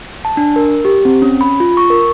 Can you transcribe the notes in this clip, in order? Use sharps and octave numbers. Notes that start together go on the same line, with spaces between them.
A5
D4
A#4
G4
C4
C#4
B5
F4
C#6
A#4